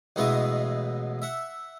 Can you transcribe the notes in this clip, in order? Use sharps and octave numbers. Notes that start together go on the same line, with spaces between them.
A1 B2 G#3 B3 D#5 E5
E5 F#5